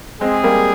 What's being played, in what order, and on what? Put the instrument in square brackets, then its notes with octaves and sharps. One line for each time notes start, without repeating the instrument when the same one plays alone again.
[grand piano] G#3 C4 [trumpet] G#4
[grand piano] G3 A#3